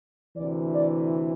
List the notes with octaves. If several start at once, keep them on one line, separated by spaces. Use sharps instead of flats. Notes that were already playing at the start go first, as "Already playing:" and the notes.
D2 C3 E3 D5
D5